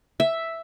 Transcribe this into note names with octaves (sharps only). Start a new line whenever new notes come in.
E5